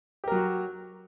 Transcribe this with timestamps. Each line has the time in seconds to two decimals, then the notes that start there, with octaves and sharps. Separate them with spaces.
0.24 G4
0.28 A#4
0.32 F#3
0.35 F#4